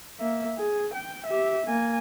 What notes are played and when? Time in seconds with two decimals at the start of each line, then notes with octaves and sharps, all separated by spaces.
0.19 A#3 E5
0.58 G#4
0.94 G5
1.27 G4 E5
1.67 A#3 G#5